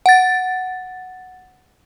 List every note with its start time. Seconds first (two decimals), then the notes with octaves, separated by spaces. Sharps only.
0.06 F#5 A6